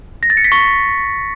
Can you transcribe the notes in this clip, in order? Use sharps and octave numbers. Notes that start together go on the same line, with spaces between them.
A#6
A6
C#7
B6
C#6